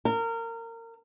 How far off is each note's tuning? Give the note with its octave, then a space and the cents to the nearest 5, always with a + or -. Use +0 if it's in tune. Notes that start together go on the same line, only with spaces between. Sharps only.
A#4 -25